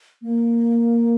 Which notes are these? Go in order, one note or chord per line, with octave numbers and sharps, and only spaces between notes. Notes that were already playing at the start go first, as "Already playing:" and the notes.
A#3